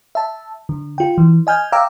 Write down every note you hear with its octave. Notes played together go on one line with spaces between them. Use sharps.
E5 A5
D3
F4 G5
E3
D#5 G#5 F6 G6
E5 F5 G5 A#5 D6 E6